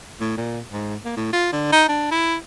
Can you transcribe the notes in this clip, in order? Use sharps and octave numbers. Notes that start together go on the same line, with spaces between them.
A2
A#2
G#2
A#3
A2
F4
D3
D#4
D4
E4